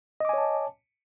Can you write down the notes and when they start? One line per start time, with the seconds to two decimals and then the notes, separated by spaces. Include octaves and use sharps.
0.20 D#5
0.25 D6
0.29 G#5
0.34 C#5
0.38 A5